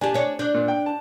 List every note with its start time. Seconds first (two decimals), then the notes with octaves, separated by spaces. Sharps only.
0.01 D4 G4 G#5 A5
0.14 D4 C#5
0.39 D4 F#6 G6
0.54 A#2
0.68 G5
0.86 A5